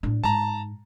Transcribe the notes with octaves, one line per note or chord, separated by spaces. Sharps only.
A2 D4
G#2 A5 A#5